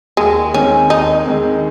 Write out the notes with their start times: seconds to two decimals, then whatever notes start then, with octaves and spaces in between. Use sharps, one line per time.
0.17 D#2 G#3
0.54 D#3 G#3 C4 C#4
0.90 D#2 D#4
1.26 D#3 G#3 C4